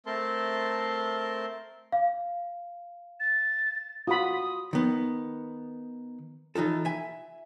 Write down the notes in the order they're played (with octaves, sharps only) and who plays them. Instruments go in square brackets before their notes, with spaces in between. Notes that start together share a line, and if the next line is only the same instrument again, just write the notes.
[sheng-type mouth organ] A3 C4 A#4 A5 C6
[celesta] F5
[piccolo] A6
[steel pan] F4 F#4 B5 [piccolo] D#6
[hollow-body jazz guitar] D#3 B3
E3 D#4 F4 A4
E5 G#5